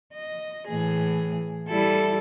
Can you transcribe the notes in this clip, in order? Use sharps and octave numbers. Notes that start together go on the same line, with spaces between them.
D#5
A2 E3 G#4
G3 E4 A4